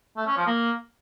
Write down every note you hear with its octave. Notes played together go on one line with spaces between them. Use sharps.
A3
C#4
F3
A#3